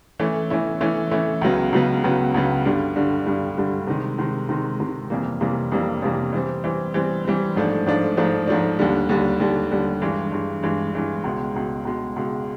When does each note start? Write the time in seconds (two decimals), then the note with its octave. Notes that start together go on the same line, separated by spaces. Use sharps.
0.20 E3 A3 C#4 E4
0.50 E3 A3 C#4 E4
0.81 E3 A3 C#4 E4
1.11 E3 A3 C#4 E4
1.41 C#2 C#3 F#3 B3
1.73 C#2 C#3 F#3 B3
2.04 C#2 C#3 F#3 B3
2.34 C#2 C#3 F#3 B3
2.65 G2 D3 G3
2.96 G2 D3 G3
3.26 G2 D3 G3
3.57 G2 D3 G3
3.87 C3 D#3 G#3
4.18 C3 D#3 G#3
4.49 C3 D#3 G#3
4.80 C3 D#3 G#3
5.10 F2 C3 E3 G3 A#3
5.41 F2 C3 E3 G3 A#3
5.72 F2 C3 E3 G3 A#3
6.02 F2 C3 E3 G3 A#3
6.33 E3 G3 C4
6.64 E3 G3 C4
6.94 E3 G3 C4
7.25 E3 G3 C4
7.56 G#2 F3 A3 D4
7.86 G#2 F3 A3 D4
8.17 G#2 F3 A3 D4
8.47 G#2 F3 A3 D4
8.79 D#2 D3 G3
9.09 D#2 D3 G3
9.40 D#2 D3 G3
9.71 D#2 D3 G3
10.01 G2 E3 G#3
10.32 G2 E3 G#3
10.63 G2 E3 G#3
10.93 G2 E3 G#3
11.24 C#2 B2 G#3
11.54 C#2 B2 G#3
11.85 C#2 B2 G#3
12.16 C#2 B2 G#3